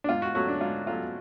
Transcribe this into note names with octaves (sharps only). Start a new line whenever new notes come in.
D4
G#2 F4
F#4
F#3 A3 C#4 F#4
D4
G#2 F4
F#3 A3 C#4 F4